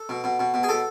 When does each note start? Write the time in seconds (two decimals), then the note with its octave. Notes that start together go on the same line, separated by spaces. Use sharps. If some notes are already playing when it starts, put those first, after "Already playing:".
Already playing: A4
0.09 B2
0.24 B2
0.40 B2
0.54 B2
0.63 G#4
0.69 B2 A4